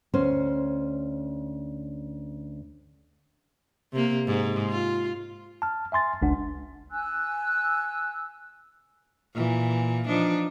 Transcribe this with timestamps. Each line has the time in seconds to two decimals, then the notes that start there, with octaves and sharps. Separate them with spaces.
0.14 D2 C#4 C5
3.93 C3 A#3
4.27 G#2
4.69 F4
5.62 A5 F6
5.92 E5 G#5 C6 A6
6.22 G1 C#2 D4 F#5
6.91 G#5 E6 F#6
9.34 A#2 E3
10.06 F3 D4 D#4